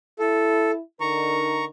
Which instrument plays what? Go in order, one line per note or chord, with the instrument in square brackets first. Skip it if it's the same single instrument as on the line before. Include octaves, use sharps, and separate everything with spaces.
[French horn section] E4 [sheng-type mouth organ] A4
[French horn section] D3 D#4 A#4 [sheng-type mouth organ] A#5 C#6